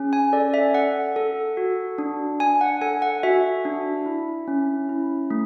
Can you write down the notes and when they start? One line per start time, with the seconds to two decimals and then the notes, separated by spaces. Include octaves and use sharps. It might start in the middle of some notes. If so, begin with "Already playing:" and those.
Already playing: C#4 G#4
0.13 G#5
0.33 A4 D5
0.54 E5
0.74 A4 F#5
1.16 A4
1.57 F#4
1.98 D4
2.40 D4 G#5
2.61 F#5
2.81 A4 G#5
3.02 F#5
3.23 F#4 E5
3.65 D4
4.06 E4
4.48 C#4
4.89 E4
5.30 A3